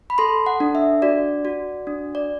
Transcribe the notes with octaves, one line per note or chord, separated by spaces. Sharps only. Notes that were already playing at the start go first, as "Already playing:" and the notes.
B5
A4 C6
F#5
D4
E5
F#4 D5
F#4
D4
D5